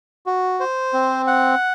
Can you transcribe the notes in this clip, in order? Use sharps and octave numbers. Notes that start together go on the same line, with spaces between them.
F#4
C5
C4
F#5